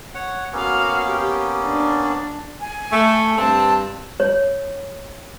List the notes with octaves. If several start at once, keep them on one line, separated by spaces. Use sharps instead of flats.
C#5 F#5
A#3 B3 C#4 F#4 F5
G4
D4
G#5
A3
G2 C4 A5
C#5